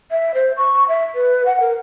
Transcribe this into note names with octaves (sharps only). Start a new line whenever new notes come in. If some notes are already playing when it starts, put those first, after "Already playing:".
E5
C5
C#6
E5
B4
F#5
A#4